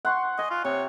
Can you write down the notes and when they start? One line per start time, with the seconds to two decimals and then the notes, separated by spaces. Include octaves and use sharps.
0.05 F#5 C6 C#6
0.39 D#5 G#5
0.51 F4
0.65 C3 C#5